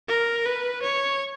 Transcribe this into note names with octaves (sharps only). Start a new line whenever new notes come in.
A#4
B4
C#5